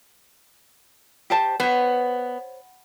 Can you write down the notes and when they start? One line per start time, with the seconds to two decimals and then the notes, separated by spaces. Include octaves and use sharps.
1.30 G4 C5 A5
1.60 B3 C5 C#5